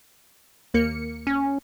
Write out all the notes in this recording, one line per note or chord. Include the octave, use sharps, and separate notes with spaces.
D#2 A#3 C#7
C#4